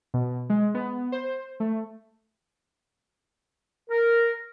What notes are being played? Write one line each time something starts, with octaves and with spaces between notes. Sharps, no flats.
B2
G#3
B3
C5
A3
A#4